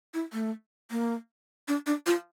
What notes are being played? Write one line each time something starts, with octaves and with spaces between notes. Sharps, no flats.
E4
A3
A#3
D4
D4
F4